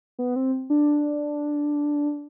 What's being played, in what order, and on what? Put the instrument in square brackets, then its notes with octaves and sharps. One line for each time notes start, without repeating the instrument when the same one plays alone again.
[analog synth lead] B3
C4
D4